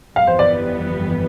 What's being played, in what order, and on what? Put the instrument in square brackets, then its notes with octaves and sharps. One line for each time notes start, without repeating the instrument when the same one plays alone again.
[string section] G1 F2 E3 G3 B3 [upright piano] F5
[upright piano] C5
D5